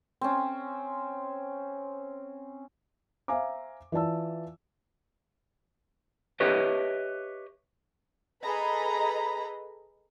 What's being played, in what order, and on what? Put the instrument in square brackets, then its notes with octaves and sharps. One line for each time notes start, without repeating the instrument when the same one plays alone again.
[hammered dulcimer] C4 C#4
[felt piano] C5 E5 F5 G#5 A#5 D6
E3 F4 D5 A5 E6
[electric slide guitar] G4 B4 C#5 D#5 E5
[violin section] G#4 A4 B4 D#5 A#5 B5